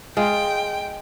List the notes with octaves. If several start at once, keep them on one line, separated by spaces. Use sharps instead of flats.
G#3 F4 G5